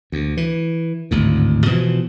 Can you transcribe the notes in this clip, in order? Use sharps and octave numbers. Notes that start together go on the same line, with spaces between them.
D2
E3
G#1 D2 A2
B2 E3 F3